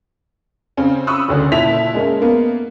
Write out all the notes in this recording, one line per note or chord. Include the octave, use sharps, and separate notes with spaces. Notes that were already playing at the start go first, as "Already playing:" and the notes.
C#3 C4 C#4
B5 C#6 D#6 E6 F#6
F#1 D2 C#4
A#2 E4 E5 A5 B6 F7
G#3 A#3 C#4
A#3 B3